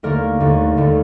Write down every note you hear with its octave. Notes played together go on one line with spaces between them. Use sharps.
D#2 D3 A3 A#3 A#4
D#2 D3 A3
D#2 D3 A3